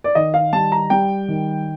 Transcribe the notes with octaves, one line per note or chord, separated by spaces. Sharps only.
D5
D#3 D#5
F5
G3 A5
A#5
G3 G5
D#3